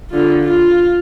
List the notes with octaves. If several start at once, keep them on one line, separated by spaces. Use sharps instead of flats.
D3 F4
F4